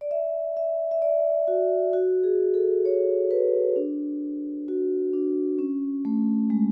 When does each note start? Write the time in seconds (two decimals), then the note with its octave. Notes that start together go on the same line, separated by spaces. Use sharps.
0.01 D5
0.11 E5
0.57 E5
0.91 E5
1.02 D5
1.48 F#4
1.93 F#4
2.23 G#4
2.54 A4
2.85 C#5
3.31 B4
3.76 D4
4.68 F#4
5.13 D4
5.59 C#4
6.05 A3
6.50 G#3